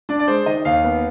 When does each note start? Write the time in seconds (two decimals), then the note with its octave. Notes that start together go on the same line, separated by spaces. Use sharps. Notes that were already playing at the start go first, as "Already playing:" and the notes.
0.09 D4 D5
0.19 D5
0.28 G#3 C5
0.46 D#3 D#5
0.65 D#2 F5
0.84 B3